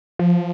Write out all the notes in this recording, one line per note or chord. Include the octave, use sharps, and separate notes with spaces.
F3